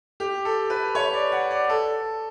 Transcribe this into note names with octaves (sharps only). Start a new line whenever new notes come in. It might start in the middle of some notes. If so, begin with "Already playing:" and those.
G4
A4
B4
C#5
D5
F#5
D5
A4